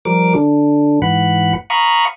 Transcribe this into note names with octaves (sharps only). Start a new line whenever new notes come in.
F3 G3 A#4 D6
D3 D4
G#2 E3 F#5 B5
F5 A#5 B5 C#6 D#6